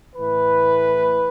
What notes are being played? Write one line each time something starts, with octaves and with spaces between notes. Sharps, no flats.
A2 E3 B4